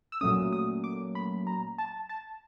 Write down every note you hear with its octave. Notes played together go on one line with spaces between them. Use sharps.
E6
A#2 F#3 A3 C#4 D#6
D#6
D6
B5
A#5
A5
A5